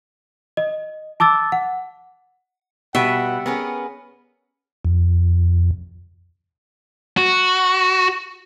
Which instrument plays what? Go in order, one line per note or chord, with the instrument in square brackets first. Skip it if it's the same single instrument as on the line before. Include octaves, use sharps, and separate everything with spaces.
[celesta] D#5
A5 D6 E6 A6
F#5
[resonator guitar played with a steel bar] B2 [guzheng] G3 [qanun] E5 [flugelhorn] F#5
[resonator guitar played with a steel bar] B3 [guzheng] C#4 G#4 A#4
[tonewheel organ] F2
[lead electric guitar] F#4